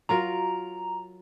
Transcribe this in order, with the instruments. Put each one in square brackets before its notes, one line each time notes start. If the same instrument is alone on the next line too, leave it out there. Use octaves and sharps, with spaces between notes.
[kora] F#3 F4 A#4 [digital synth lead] A#5